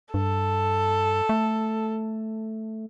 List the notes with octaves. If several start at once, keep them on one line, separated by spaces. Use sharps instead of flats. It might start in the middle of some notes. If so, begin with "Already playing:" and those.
G2 A4
A3